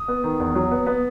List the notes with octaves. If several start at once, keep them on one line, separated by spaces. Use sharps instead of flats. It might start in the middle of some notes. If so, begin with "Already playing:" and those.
Already playing: D#6
B3
D#3
E2
F#3
B3
B3